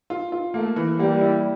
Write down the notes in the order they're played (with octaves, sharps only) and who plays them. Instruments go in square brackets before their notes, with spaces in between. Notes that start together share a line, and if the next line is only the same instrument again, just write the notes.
[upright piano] F4
F4
[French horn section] A3 [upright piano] A#3
[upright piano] E3
[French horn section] G3 [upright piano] A#3
[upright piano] E4